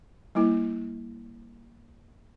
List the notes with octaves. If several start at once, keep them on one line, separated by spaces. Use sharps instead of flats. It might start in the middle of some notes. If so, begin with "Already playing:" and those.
G3 A#3 E4